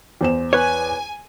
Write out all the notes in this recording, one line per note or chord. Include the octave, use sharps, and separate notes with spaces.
E2 C5 E7
B4 C#5 G#5